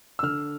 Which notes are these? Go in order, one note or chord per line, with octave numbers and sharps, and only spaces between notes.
E6
D3 F6